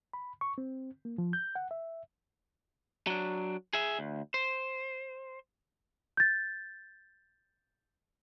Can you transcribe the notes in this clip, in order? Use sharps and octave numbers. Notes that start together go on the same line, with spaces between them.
B5
C#6
C4
A#3
F3
G6
F#5
E5
F#3 D4
G#4 E5
D2
C5
G6 A6